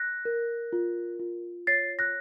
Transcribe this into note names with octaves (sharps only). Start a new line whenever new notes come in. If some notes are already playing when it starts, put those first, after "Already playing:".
Already playing: F#6 A#6
A#4
F4
F4
C#5 A6 C7
F#6 A#6